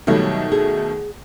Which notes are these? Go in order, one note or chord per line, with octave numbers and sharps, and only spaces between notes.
B2 D#3 F#3 G3 A3
G#4